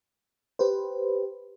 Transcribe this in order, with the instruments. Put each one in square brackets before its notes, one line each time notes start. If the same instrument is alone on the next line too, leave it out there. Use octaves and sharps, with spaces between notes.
[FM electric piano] G4 B4 C5